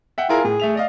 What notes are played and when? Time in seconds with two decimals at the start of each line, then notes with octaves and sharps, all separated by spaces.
0.18 E5 F#5 G5
0.29 E4 F4 G#4 A#4
0.44 A2 G#4
0.60 A3 E5 F7
0.75 D5 D#5 F5